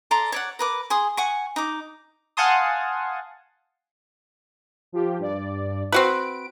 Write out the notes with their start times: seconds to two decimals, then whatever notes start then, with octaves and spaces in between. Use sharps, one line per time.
0.11 A4 D5 A#5 C6
0.32 C#5 D5 F#5
0.59 A#4 B4 D6
0.90 G#4 C6 D#6
1.17 F#5 G#5 C#6
1.56 D#4 D6
2.37 F5 F#5 G#5 A5 C6 D#6
4.92 F3 F4 G4
5.19 G2 D5
5.92 C4 F#4 B4 D7